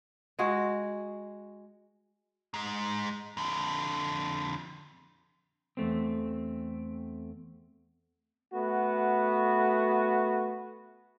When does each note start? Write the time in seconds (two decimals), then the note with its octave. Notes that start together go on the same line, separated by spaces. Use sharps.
0.39 G#3 F#4 G#4
2.54 G#2 G#3
3.37 F2 D3
5.77 E2 A3 C4
8.53 A3 B3 F#4